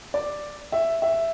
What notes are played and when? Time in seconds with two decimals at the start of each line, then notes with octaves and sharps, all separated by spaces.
0.14 D5
0.72 E5
1.02 E5